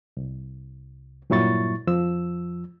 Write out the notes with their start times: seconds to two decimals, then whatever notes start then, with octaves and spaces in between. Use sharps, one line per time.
0.17 C2
1.30 G2 A#2 F#3 E4 C#6 A6
1.87 F2 F3 E6